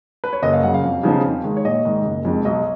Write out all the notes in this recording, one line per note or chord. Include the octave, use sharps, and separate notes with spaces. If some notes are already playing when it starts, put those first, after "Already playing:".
B4
C#5
F#1 D#5
F5
F#2 C#3 F#5
F5
F2
C#3 F3 B3 D#4
F2
D#3 G#3
C#5
A#1 D#5
G#2 D#3
F#1
F2 F3 G#3
B1 D#5